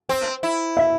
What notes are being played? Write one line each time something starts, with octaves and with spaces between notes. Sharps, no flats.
C4
E4
E5